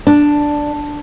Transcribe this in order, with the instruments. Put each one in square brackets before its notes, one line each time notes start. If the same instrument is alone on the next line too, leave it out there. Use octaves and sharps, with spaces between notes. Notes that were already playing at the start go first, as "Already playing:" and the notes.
[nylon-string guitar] D4